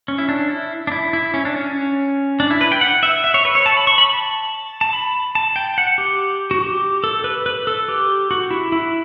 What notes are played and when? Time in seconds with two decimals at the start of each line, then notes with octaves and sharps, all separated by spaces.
0.08 C#4
0.18 E4
0.29 D4
0.50 E4
0.87 D4
0.92 E4
1.13 E4
1.34 C#4
1.45 D4
1.56 C#4
2.40 D4
2.51 E4
2.61 B4
2.72 G5
2.81 F#5
3.03 E5
3.24 E5
3.34 C#5
3.45 B4
3.55 C#5
3.66 A5
3.77 B5
3.87 C#6
3.98 B5
4.08 A5
4.81 A5
4.93 B5
5.35 A5
5.56 G5
5.78 F#5
5.98 G4
6.51 F#4
6.61 G4
7.04 A4
7.24 B4
7.46 B4
7.67 A4
7.88 G4
8.31 F#4
8.51 E4
8.72 E4